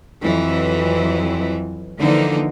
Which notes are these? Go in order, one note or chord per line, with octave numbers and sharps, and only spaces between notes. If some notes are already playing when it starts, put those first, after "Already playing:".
F2 E3 F#3
D3 E3 F3 A#3 D#4